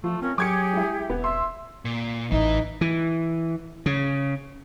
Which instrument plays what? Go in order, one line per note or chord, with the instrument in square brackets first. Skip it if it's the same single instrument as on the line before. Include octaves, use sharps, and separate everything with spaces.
[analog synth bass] F3 [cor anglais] A3 [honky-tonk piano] F4
[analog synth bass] C4 [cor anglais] C#4 [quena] A#4
[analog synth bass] F#3 [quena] G4 [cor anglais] G#4 [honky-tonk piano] D6 G#6 C#7
[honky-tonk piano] G#3 E4 E5
[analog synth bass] E1 [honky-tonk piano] B3
[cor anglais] E5 [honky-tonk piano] C6
[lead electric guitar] A#2
[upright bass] A1 [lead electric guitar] E3 E4 [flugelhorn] D#4
[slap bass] E3
C#3